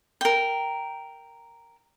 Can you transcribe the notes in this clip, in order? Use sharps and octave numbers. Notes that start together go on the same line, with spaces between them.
A#4 G5